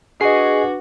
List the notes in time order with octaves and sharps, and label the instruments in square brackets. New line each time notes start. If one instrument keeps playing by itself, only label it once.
[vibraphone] D4 B4 D6 [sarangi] F#4 [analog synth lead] G#4 [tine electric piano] D#5 C7